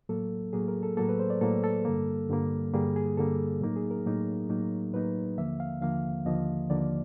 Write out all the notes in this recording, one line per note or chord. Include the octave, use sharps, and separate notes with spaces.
A2 F#3 A#3 A4
A2 F#3 A#3 G#4
A#4
A4
A2 F#3 A#3 A4
B4
C5
D5
A2 F#3 A#3 A4
A4
G2 D3 G3 A#3
G2 D3 G3 A#3
G2 D3 G3 A#3 G#4
G#4
G2 D3 G3 A#3 A4
A2 F#3 A#3 D#4
G#4
A#4
A2 F#3 A#3 D#4
A2 F#3 A#3 D#4
A2 F#3 A#3 D#4 B4
D#2 D3 F3 A#3 E5
F5
D#2 D3 F3 A#3 F5
D#2 D3 F3 A#3 D#5
D#2 D3 F3 A#3 D5